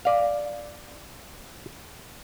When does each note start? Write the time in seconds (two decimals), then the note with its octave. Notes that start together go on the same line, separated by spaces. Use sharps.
0.05 D5 F5